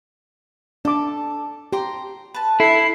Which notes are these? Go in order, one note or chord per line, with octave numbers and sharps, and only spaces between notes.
D4 A4 D6
G4 G5 A#5 C6
B4 A5
E4 A4 C7